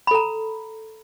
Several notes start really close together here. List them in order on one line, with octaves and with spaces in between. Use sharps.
B5 A4 A#5